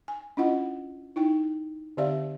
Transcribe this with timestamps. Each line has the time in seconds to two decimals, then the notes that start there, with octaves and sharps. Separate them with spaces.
0.08 G#5
0.37 C#4 D4 E4 F4 D#5 F#5
1.16 D#4 E4 G5
1.97 D3 C4 G4 D5 E5 F5